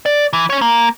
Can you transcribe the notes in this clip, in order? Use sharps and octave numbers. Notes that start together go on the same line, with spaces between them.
D5
E3
C#4 C#5
A#3